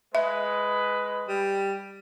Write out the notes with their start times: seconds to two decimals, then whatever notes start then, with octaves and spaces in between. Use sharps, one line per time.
0.15 G#3 B4 E5
1.29 G3